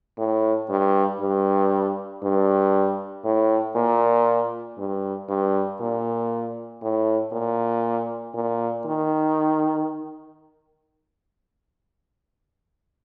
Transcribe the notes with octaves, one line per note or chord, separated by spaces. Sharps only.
A2
G2
G2
G2
A2
A#2
G2
G2
A#2
A2
A#2
A#2
D#3